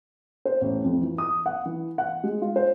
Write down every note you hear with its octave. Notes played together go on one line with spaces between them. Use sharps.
C5
A1
F2
E3
D#6
F#5
E3
F#5
G#3
F4
C5